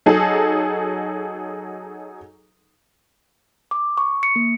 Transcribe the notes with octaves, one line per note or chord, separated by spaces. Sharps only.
F#3 D#4 G#4 A4
D6
C#6
C#7
A#3